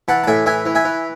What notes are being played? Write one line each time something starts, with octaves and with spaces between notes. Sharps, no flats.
E3 F#5 A5
A5
A2 E5 G#5
E3 E5 G#5
E3
E5 G#5
E3